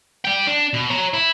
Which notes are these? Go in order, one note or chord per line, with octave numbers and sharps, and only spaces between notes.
D5 G5
D4
B2
C#5 A#5
E4